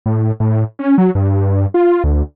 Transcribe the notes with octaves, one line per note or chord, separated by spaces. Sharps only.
A2
A2
C#4
F#3
G2
F4
D2